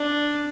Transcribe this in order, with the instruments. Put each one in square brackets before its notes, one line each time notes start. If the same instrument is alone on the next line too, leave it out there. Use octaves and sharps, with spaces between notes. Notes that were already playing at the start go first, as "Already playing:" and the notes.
Already playing: [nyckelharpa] D4